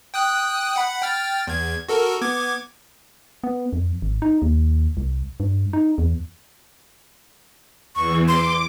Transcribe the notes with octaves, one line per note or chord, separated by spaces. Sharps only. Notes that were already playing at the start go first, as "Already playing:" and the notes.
G5 D#6 F#6
F#5 B5
G5 F6 A6
E2 G#6
F#4 A4 A#4
B3 D6 G#6
B3
F2
G#1
D#4
D#2
C2
G2
D#4
E2
E2 E3 C#6
C6 D6